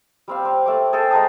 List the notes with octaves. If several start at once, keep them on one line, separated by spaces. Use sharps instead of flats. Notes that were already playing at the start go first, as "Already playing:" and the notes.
G3 C4 F5
C4
A3 D6
G#4 A4 G5 A5
G#3 A#4 A5 D#6